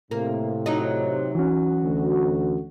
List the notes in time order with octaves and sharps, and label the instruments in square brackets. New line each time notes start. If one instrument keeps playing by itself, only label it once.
[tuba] A2 [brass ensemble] C3 [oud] A#3
[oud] F#3 D#4
[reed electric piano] E3 C#4 [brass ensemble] F#4
[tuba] D2